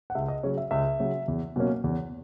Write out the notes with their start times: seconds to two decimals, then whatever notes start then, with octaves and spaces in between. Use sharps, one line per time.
0.10 F#5
0.15 C#2 E5
0.28 D#5
0.43 C#3 F#3 C#5
0.57 E5
0.71 C#2 E5
1.00 C#3 F#3
1.28 E2
1.56 B2 F#3 A#3 C#4
1.84 E2